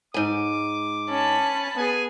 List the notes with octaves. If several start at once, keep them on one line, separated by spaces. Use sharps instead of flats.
G#2 G#5 D6
C#4 A5 B5
B3 G#4 G#5